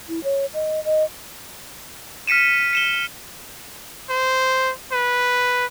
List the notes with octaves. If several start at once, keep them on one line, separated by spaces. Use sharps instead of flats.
E4
C#5
D#5
D#5
F6 B6 C#7 D#7 E7
C#7 E7 G7
C5
B4